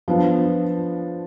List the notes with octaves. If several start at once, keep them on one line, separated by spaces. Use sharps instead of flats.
F3 B3 D4